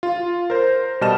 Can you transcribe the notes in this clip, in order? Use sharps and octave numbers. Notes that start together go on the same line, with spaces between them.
F4
A#4 C5
B2 G3 D#5 A5 F6 E7